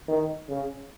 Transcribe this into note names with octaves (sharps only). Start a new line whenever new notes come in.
D#3
C#3